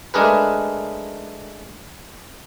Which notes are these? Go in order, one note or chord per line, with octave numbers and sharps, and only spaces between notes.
G#3 A3 D4 G#4 A#4 B4